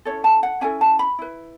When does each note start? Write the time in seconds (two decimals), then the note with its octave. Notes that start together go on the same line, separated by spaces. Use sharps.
0.05 C#4 E4 A4 C#5
0.24 A5
0.43 F#5
0.61 C#4 E4 A4 G#5
0.81 A5
0.99 B5
1.19 E4 B4